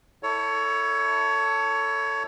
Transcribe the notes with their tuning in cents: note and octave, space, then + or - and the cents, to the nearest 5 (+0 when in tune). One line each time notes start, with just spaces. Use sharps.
E4 -20 A4 +15 C#5 +20